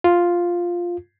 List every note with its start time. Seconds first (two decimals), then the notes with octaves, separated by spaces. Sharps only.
0.04 F4